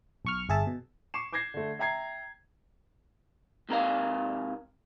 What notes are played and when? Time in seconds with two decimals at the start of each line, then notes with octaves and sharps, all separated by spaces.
0.25 B1 C#6 F6
0.49 G1 G#4 E5 A5
0.67 B2
1.14 C#6 D6 C7 E7
1.33 D6 G6 G#6 A#6 C7
1.54 D3 A3
1.79 E5 G5 A#5 G#6 C7
3.69 G#2 C3 A#4 F5